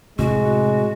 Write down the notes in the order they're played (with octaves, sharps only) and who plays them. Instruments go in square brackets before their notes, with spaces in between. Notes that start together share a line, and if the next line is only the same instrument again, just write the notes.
[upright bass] A2 [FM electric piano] C3 [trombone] G#3 [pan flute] F#4